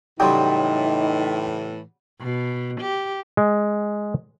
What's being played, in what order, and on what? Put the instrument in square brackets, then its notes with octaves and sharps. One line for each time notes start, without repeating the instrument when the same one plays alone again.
[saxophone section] A2 E3 [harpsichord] C#3 F#3 G3 [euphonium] D#4 [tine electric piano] G5 C6
[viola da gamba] B2
G4
[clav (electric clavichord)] G#3